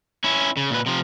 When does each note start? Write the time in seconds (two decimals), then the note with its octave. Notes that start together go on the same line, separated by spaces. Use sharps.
0.24 C#4 E4
0.57 C#3
0.70 A#2 B4
0.86 C3 F3